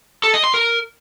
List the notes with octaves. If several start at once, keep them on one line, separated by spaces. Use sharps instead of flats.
A4
D#5
C6
A#4